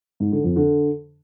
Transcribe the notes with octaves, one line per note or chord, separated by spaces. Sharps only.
G#2
D3
F2
D3